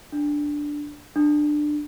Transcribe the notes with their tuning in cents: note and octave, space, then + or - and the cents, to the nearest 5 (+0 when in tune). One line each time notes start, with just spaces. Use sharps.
D4 +0
D4 +20